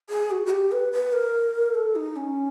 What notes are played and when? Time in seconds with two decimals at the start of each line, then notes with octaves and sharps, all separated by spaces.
0.09 G#4
0.31 F#4
0.46 F#4
0.51 G4
0.72 B4
0.93 B4
1.13 A#4
1.75 A4
1.95 D#4
2.16 C#4